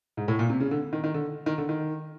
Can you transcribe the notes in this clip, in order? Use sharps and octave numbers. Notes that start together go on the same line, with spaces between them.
G#2
A2
A#2
C3
C#3
D3
D#3
D#3
D3
D#3
D3
D#3